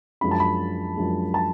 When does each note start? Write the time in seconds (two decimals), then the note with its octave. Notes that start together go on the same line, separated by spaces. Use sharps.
0.21 F#2 F3 G#3 D4 B5
0.31 A5
0.40 B5
0.97 F#2 F3 G#3 D4
1.34 A5